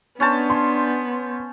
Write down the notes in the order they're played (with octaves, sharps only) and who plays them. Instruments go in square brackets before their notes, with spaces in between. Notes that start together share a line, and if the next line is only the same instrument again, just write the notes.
[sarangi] B3 [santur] C#4 C5 A5 [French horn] D4
[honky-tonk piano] C6